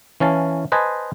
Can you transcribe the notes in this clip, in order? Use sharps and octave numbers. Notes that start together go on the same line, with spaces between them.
E3 C#4 F5 A5
B4 C5 D#5 G#5 A5